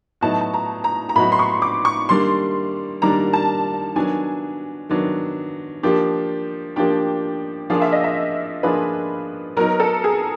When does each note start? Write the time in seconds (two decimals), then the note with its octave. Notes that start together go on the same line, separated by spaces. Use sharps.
0.21 A2 F#3 B3 D#4 F#4 A5
0.41 A5
0.54 A#5
0.84 A#5
1.09 A#5
1.15 A2 F#3 B3 D#4 F#4 B5
1.32 C6
1.39 C#6
1.62 D6
1.85 C#6
2.09 D#3 G3 A#3 D4 C6
3.02 D#3 G3 A#3 D4 A#5
3.33 A5
3.96 D#3 F#3 B3 D4 G#5
4.89 D#3 F#3 B3 D4
5.83 F3 A#3 D4 G4
6.76 F3 A#3 D4 G4 G5
7.70 F3 A#3 D4 F4 G#4 F5
7.82 E5
7.92 D#5
8.04 E5
8.63 F3 A#3 D4 F4 G#4 B4
9.57 F#3 B3 D#4 A#4
9.80 A4
10.04 G#4